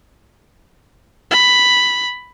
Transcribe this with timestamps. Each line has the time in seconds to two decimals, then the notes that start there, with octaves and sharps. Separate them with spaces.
1.31 B5